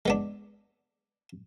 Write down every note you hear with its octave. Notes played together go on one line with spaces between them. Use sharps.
G#3 B3 D4